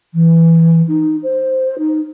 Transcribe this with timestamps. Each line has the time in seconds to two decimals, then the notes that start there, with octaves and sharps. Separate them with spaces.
0.14 E3
0.88 D#4
1.23 C5
1.78 D#4